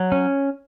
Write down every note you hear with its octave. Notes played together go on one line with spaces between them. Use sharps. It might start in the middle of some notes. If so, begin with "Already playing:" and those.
Already playing: F#3
C#4